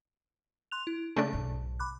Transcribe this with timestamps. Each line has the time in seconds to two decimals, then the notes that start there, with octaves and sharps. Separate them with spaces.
0.71 C6 F#6 F7
0.87 E4
1.16 C#3 A3 D4 A5
1.33 B1 G#2
1.79 B5 D6 F#6